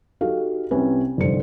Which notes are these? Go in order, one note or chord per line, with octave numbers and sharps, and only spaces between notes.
D#4 F#4 G4 A4 F5
C2 C3 C#4 B4
F1 C2 G2 D3 C5 C#7